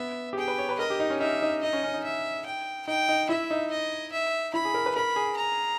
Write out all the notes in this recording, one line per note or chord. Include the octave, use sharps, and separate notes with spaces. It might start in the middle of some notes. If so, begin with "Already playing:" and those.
Already playing: B3 E5
G4
G#4 G5
B4
C#5
B4
A#4 D#5
G4
D#4
C#4
D#4 E5
D#4
D#4 D#5
C#4
C#4
D#4
E5
G5
D#4 G5
D#4
E4 E5
D#4
D#5
E5
E4 B5
G#4
A#4
B4
A#4 B5
G#4
A#5